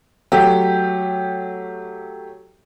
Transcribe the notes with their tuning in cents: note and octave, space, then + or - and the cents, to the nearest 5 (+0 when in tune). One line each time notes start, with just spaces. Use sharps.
F#3 +0 A3 +0 G4 +0